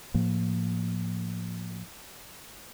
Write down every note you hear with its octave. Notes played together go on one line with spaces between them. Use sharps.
A2 F3 A#3